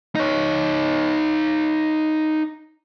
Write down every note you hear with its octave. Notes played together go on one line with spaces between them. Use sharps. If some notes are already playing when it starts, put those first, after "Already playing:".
D#4 C#5